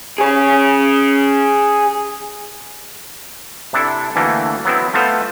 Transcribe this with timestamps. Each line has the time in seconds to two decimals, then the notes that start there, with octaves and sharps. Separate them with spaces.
0.18 G#4 C#5
3.73 C3 D4 E4 A4
4.16 D2 E3 A3 A#3
4.65 F#3 B3 C4 E4
4.94 A3 B3 F4 C5